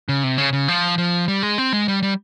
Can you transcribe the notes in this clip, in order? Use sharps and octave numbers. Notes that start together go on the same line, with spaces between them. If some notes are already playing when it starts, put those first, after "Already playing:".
C#3
C3
C#3
C#3
F3
F3
G3
G#3
C4
G#3
G3
G3